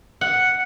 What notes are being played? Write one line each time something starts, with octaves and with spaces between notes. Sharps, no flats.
F#5